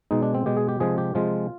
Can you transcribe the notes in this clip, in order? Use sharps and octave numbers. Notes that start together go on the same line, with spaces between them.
B2 G#3 D#4
D4
C4
B2 G#3 G4
G#4
G4
C3 F3 G#3 G#4
G4
C3 F3 G#3 F4